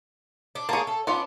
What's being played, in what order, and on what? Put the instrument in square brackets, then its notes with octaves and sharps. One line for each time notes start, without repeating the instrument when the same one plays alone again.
[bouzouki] D4
[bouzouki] A#3 G#4 [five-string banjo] C#5 A5
[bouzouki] A4
[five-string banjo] B3 C#4 F4 [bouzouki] D4